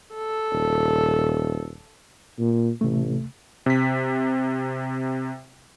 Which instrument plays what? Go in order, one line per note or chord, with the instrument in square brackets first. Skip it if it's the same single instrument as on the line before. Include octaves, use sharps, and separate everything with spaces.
[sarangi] A4
[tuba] D#1
A#2
[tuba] A1 [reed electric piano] C3 A3
[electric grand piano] C3 B6